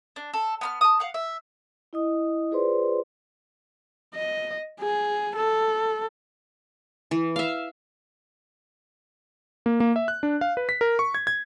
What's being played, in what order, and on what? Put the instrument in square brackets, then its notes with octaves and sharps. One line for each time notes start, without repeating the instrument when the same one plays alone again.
[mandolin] D4
A4
B3 B5 F6
A5 D#6
F5 F#5
E5
[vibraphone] E4 D#5 D#6
F4 G#4 B4 C5 D5 C6
[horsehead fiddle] D#5
G#4
A4
[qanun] E3
E5 F5
[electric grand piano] A#3
A#3
E5
F#6
D4
F5
B4
B6
A#4
C#6
G#6
G#6